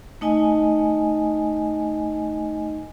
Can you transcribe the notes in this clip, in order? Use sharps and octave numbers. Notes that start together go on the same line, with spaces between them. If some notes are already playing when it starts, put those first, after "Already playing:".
A3 D#4 D#5 G#5